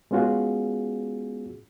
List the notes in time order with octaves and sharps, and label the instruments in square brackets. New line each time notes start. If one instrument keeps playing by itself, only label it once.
[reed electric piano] G#3 B3 C#4 F4 F#4 G#4